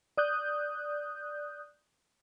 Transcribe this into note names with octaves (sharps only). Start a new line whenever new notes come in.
D5 D#6 F#6 G6